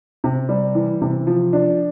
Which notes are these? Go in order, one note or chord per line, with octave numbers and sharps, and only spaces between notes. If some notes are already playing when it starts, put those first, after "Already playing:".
C3
G3
E3
C3
F3
D4